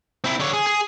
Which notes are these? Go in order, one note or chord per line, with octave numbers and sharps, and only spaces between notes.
C4 E4
D3 C#5
G#4
G#4